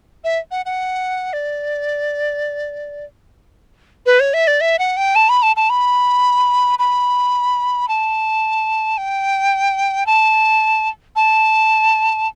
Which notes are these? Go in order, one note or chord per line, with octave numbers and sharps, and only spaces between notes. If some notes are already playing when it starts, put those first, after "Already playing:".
E5
F#5
F#5
D5
B4
C#5
E5
D5
E5
F#5
G5
A5
B5
A5
A5
B5
B5
A5
G5
A5
A5